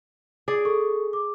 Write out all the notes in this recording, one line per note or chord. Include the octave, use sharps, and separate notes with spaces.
G#4 D5
A4 C#6
D6